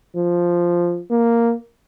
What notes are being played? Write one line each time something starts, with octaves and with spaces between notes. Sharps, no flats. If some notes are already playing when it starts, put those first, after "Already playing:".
F3
A#3